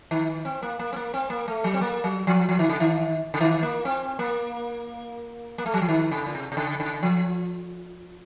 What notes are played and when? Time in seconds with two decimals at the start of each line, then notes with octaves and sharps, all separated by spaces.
0.11 D#3
0.45 C4
0.63 A#3
0.79 A#3
0.93 C4
0.96 A#3
1.14 C4
1.30 A#3
1.48 A3
1.64 F#3
1.74 C4
1.81 A#3
2.04 F#3
2.27 F3
2.49 F3
2.59 D#3
2.69 C#3
2.80 D#3
3.34 C#3
3.41 D#3
3.63 A#3
3.85 C4
4.19 A#3
5.58 A#3
5.66 A3
5.74 F#3
5.82 F3
5.89 D#3
6.11 C#3
6.27 A#2
6.35 C3
6.52 C3
6.57 C#3
6.80 C#3
7.03 F3